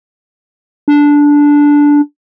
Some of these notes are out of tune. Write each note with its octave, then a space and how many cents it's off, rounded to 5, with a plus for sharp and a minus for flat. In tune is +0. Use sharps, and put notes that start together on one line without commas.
D4 -10